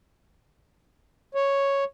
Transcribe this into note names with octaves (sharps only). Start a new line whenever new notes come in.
C#5